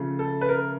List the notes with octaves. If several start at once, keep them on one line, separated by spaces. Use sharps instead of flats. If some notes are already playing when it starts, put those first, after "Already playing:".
Already playing: C#3 F3 A3
A4
B4
A#4